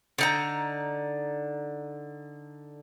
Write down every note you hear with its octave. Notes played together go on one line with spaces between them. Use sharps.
D3 D#4 A#5